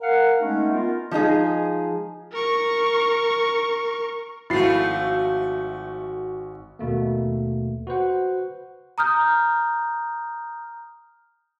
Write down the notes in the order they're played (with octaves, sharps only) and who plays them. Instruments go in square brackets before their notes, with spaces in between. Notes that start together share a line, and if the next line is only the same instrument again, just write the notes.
[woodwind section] A#4 F5 F#5
G#3 A3 B3 C#4 D#4
B3 F4 A#4
[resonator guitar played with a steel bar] F3 G#3 D#4 G#4
[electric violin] A#4 C#6
[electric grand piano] G#1 F#4 [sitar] F3 A3 [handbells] E4 C7
[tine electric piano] D#2 B2 A3 A#3
F#4 B4 C5 F#5
[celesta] A#5 D#6 F6 G6